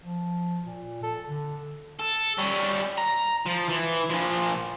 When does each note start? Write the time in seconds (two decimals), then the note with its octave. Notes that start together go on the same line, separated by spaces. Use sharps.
0.05 F3
0.66 A#2
1.03 A4
1.28 D3
1.99 A4
2.38 G3 C#4
2.98 A#5
3.46 F3
3.69 E3
4.09 A#2 F3